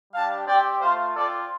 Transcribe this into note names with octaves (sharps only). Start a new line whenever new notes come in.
G3 D4 G4 F5 A5
C4 G4 D5 G5
A3 F4 C5 F5
C4 F4 A4 D5